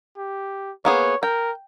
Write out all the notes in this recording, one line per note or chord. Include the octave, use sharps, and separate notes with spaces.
G4
A#3 B3 G#4 C#5
A#4 G5